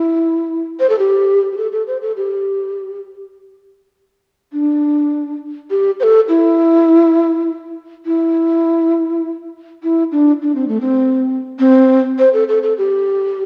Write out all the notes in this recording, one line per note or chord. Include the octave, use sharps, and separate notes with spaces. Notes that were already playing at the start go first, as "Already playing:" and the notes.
Already playing: E4
C5
A4
G4
G4
A4
A4
C5
A4
G4
D4
G4
C5
A4
E4
E4
E4
D4
D4
C4
A3
C4
C4
C5
A4
A4
A4
G4